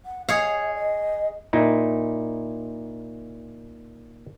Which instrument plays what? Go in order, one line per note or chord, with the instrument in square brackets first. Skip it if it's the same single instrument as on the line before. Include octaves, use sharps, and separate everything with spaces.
[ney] F#5
[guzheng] G#4 C#5 F5 [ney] D#5
[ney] D#5
[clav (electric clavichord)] A#2 D#4 E4